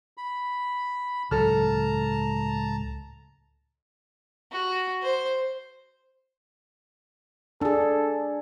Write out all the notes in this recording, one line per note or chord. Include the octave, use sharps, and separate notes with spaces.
B5
C#2 A2 F#3 A4 A5 A#5 F6
F#4
C5
D4 G#4 A4